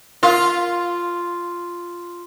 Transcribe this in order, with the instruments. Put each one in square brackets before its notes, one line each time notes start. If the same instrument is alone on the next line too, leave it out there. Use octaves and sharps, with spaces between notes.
[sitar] F4 [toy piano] A#4 F5